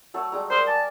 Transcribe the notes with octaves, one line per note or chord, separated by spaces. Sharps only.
F#3 A3 A5
G3 G#3 A#5
A#4 C5 D#5 E5
G#5 A5 D6